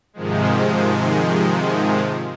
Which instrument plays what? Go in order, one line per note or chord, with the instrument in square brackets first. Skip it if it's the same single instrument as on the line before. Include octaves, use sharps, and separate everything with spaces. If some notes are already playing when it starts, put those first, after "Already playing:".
[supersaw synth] G#2 C3 D#3 F3 G#3